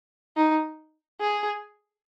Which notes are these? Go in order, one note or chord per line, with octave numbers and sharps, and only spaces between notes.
D#4
G#4